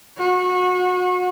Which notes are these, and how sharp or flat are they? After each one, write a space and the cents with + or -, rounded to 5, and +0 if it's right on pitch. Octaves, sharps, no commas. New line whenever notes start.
F#4 -30